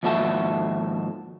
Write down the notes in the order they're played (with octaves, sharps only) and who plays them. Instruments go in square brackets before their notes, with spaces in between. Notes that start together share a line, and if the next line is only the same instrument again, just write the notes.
[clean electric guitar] D#2 G#2 F3 E4 F#4 A4